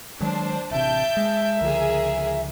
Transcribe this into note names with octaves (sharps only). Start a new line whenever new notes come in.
D#3 F#3 G#3 D4 C5
A1 C3 E5 A5 G6 D7
G#3
C#2 D3 F3 G#4 A#4